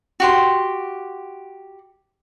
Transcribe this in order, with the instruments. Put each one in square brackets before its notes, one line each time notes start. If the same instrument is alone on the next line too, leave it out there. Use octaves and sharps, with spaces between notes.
[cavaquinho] F#4 G4 C6